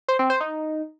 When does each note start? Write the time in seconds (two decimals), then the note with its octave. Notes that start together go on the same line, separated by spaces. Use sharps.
0.08 C5
0.19 C4
0.30 C5
0.40 D#4